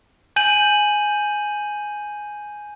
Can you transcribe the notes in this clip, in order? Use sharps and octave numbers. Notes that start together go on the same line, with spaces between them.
G#5 G6 D#7 F#7